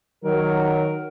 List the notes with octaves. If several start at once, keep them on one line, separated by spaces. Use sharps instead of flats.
D#3 F#3 A#4